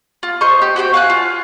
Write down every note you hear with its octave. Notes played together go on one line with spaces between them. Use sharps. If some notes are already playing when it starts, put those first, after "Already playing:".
F4
C5 D#5 C6 C#6
G4
F#4 C5 D5 G5
F5 F#5 G#5 F#6
F4